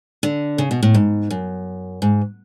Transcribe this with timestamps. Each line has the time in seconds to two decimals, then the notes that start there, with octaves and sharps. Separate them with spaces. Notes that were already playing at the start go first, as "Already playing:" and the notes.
0.23 D3
0.58 C#3
0.71 B2
0.83 A2
0.94 G#2
1.30 F#2
2.02 G#2